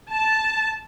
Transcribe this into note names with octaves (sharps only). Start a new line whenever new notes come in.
A5